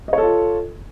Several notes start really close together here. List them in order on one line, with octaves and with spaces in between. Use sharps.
D#5 C#5 A4 F4